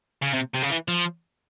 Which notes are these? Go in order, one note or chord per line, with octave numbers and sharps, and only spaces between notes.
C#3
C3
C3
C#3
E3
F3